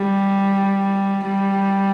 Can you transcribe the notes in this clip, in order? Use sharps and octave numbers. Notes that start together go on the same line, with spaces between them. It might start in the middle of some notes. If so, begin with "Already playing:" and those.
Already playing: G3
G3